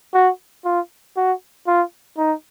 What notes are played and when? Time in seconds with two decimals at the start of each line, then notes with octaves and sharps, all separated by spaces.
0.14 F#4
0.65 F4
1.17 F#4
1.67 F4
2.18 D#4